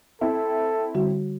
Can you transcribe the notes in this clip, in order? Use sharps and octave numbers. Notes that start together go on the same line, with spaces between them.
C4 E4 A4
D3 G3 F#4